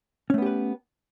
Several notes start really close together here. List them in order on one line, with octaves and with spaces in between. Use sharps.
C#4 A3 B3 G4 B4